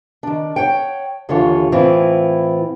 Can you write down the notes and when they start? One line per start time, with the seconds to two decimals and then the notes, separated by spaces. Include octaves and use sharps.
0.23 D#3 D4
0.56 C#5 F#5 G5
1.29 D#2 D3 E3 F4 C#5
1.72 A2 E3 C4 E4 F4